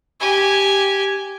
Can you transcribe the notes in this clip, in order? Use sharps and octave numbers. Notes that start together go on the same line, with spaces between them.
G4 G#5